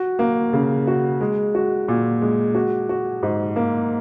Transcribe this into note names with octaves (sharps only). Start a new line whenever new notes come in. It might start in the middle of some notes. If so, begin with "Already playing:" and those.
Already playing: F#4
A#3
C#3
F#4
G#3
F#4
A#2
G#3
F#4
F#4
G#2
A#3